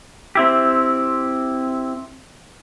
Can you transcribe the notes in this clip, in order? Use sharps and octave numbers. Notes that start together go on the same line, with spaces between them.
C4 E4 G4